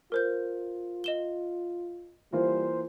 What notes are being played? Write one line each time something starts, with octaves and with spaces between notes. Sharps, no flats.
F4 A#4 C5 G6
D#5 E7 G7
E3 G3 A#3 F4 C5